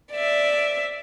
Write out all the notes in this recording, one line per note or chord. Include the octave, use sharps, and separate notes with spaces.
D5 E5